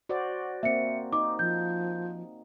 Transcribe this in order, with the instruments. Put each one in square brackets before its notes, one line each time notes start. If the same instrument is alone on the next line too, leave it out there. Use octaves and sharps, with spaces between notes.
[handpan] F#4 C5 D5
[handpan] A#3 C4 [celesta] E5 C#7
[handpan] D#4 [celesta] D6
[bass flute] F3 [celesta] G6